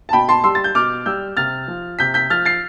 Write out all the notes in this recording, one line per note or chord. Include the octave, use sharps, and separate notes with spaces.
A5
B2 G5 B5
A5 C6
G3 C6 E6
A6
G6
B2 D6 F6
G3 E6 G6
C3 F6 A6
F3
C3 G6 B6
G6 B6
F3 F6 A6
A6 C7